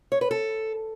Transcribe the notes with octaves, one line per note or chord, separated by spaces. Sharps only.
C#5
B4
A4